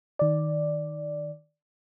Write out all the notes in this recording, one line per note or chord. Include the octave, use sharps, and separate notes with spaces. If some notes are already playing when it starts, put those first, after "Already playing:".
D#3 D5